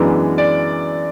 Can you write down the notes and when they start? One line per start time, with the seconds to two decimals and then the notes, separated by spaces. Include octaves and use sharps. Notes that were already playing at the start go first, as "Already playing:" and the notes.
Already playing: F#2 E3 G#3 B3 D4
0.38 D5